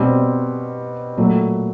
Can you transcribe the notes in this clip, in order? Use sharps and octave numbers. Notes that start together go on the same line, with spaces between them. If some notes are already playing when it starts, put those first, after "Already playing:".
Already playing: B2 G3 C4
A#2 F#3 A3